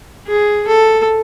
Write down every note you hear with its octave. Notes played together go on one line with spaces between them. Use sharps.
G#4
A4